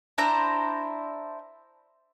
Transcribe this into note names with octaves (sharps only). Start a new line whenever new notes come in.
D4 E4 C5 A#5